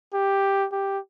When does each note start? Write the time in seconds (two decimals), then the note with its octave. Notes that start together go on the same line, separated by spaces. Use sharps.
0.14 G4
0.72 G4